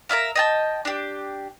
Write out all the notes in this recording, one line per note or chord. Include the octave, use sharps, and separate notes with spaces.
A#4 D5 E5 F5
D#5 G5 A5
D4 G4